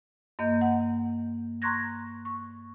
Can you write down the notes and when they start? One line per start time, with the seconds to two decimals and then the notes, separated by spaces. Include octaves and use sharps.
0.39 G2 A#3 D#5 G6
0.61 F#5
1.62 A#5 C6 C#6 F#6 G#6 A#6
2.25 C#6